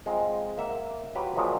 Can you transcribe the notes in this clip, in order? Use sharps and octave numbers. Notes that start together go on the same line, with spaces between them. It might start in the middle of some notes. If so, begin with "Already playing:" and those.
G#3 C4 D#4 F4
A#3 E5 F#5
F#3 F4 G4 B4
A#2 F3 F#3 G#3 D#4